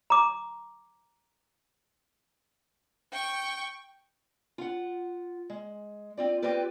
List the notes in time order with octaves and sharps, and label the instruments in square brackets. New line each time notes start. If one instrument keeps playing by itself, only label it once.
[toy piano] A#5 D6
[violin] G5 C#6
[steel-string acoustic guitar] F4 F#5
G#3
C4 F4 D5
C4 F4 G4 B4 D5